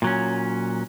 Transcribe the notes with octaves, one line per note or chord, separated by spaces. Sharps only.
A#2 F#3 C#4